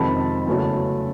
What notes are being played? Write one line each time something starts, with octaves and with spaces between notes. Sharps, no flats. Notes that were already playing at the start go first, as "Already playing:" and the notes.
Already playing: F2 C3 D#3 G#3 C4 A5 B5
E2 C#3 F#3 A3 C#4